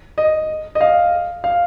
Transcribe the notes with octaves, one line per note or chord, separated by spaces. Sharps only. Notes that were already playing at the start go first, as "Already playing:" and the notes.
D#5
D#5
F5
F5